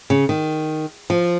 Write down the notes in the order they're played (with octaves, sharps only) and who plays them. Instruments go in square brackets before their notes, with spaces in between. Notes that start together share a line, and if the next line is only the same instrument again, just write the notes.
[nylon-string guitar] C#3
D#3
F3